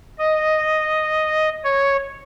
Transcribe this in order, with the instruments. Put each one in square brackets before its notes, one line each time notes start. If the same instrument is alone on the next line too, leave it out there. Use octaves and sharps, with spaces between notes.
[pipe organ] D#5
C#5